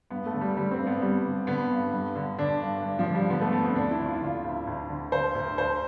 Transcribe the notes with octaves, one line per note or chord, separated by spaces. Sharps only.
G2 B3
A3
D3
G3
D3 G3
C4
G2
B3
G2 G3
D3
D3 B3
G2
G2
D3
D3 D4
G2
G2
F3
D3
G3
D3 B3
A3
G2 B3
C4
D2 D4
E4
D3
F4
E4
D3 F4
D2
D2
D3
D3 C5
D2
D2 C5